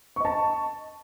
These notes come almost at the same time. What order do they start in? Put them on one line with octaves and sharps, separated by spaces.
C#6 D#5 A5